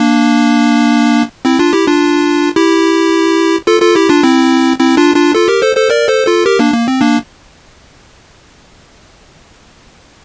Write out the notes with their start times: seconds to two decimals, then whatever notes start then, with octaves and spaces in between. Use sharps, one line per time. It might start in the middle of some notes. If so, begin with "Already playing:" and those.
Already playing: A#3 D4
1.45 C4 E4
1.59 D4 F4
1.73 E4 G4
1.87 D4 F4
2.56 E4 G4
3.67 F4 A4
3.82 F4 A4
3.95 E4 G4
4.09 D4 F4
4.23 C4 E4
4.79 C4 E4
4.97 D4 F4
5.16 D4 F4
5.35 F4 A4
5.48 G4 A#4
5.62 A4 C5
5.76 A4 C5
5.90 A#4 D5
6.08 A4 C5
6.27 F4 A4
6.46 G4 A#4
6.59 A#3 D4
6.74 A#3
6.88 C4
7.01 A#3 D4